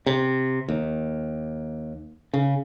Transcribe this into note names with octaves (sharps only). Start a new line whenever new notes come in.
C3
D#2
C#3